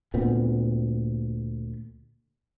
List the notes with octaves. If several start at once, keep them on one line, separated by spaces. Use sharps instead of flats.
D2 A#2 B3 C4